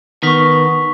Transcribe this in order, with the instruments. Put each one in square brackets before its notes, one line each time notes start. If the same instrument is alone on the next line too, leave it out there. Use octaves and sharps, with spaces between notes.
[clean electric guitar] D#3 [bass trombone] B3 [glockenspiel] C#6 B6